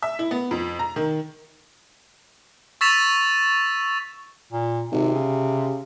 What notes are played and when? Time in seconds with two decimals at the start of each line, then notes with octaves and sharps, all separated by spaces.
0.03 E5
0.19 E4
0.31 B3
0.51 F2
0.79 A#5
0.96 D#3
2.81 C#6 E6 A6 B6 E7 F7
4.52 A#2
4.91 G#1 C3
5.15 C#3